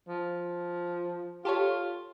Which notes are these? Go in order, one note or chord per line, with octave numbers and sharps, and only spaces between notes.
F3
F4 G4 A4 C#5